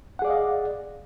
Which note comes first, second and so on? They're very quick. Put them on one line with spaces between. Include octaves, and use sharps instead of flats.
F#5 G#4 D5 F5 D#5